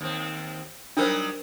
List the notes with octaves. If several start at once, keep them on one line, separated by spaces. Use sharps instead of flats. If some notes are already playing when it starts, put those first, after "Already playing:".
D#2 C4
F#3 G3 D4 D#4 A#4 C5